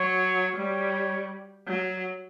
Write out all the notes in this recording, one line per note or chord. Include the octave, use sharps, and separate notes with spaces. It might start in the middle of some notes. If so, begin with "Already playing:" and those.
Already playing: F#3 C#5
G3 C#5
F#3